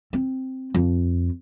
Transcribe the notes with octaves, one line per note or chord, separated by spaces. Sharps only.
C4
F2